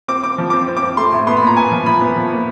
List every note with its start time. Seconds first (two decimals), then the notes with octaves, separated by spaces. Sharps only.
0.08 C4 D6
0.23 C4 D6
0.38 F3
0.50 C4 D6
0.68 C4
0.77 D6
0.82 C4
0.97 A3 C6
1.12 A2
1.27 B3 C6
1.37 B5
1.42 A#2 A#5
1.56 B3 G#5
1.72 F3
1.86 F3 B5
2.01 B3
2.16 F3
2.31 A#2